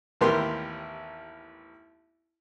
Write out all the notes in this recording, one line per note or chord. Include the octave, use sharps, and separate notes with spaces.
A1 D#2 B3 G4 A#4 C6